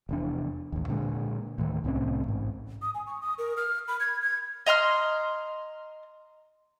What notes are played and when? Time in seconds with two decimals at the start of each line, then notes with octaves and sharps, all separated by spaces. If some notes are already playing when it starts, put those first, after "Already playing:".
0.09 F1 E2 D4
0.72 A1 D#2
0.88 A#2 D3 G#3
1.58 D2 A2 D#3
1.84 C2 A2 C4 C#4
2.25 A1 G#2
2.82 D#6
2.94 G#5
3.07 C#6
3.22 D#6
3.38 A#4
3.57 F6
3.88 B5
4.00 G#6
4.22 G#6
4.66 D#5 A#5 C6 F6